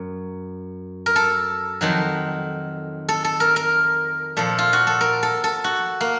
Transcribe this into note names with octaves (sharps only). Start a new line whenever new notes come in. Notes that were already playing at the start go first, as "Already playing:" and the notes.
Already playing: F#2
A#4
A4
F2 D#3 F#3
A4
A4
A#4
A#4
A#2 F3 A4
F4
F#4
A4
A#4
A4
A4
F#4
A#3